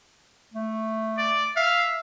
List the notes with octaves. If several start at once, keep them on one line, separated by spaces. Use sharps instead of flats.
A3
D5
E5 F5